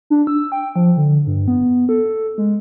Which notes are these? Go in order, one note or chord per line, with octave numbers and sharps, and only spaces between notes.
D4
E6
G5
F3
D3
G2
B3
A4
G#3